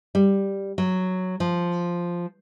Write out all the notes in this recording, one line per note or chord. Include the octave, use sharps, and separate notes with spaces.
G3
F#3
F3